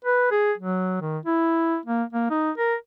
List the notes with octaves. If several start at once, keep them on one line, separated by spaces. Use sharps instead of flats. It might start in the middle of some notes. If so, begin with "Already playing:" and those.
B4
G#4
F#3
D#3
E4
A#3
A#3
D#4
A#4